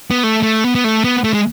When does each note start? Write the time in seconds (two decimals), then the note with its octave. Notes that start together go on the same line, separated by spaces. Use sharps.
0.11 B3
0.23 A3
0.43 A3
0.64 B3
0.75 B3
0.84 A3
1.04 B3
1.24 A3
1.34 G#3